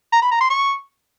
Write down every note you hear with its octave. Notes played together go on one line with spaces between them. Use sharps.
A#5
B5
A#5
C6
C#6